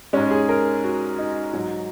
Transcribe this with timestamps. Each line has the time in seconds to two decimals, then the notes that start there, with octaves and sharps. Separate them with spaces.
0.13 G#2 G#3 C#4
0.31 G#4
0.49 A#4
0.84 F#4
1.18 D#4
1.53 G#2 F#3